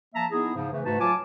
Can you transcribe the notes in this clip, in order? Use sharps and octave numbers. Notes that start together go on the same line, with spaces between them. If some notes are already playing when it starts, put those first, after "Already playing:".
F3 A#3 E5 A5 A#5
B3 D#4 E4 G#4
G#2 C#3 F3
C#3 E3 A3
G#2 A3 D#4 F#4 B4 A5
F#3 F4 G#5 A5 D6